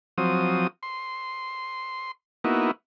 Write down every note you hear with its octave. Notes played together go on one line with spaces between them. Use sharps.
F3 F#3 C4 D#6
C6
A#3 B3 D#4 E4 F#4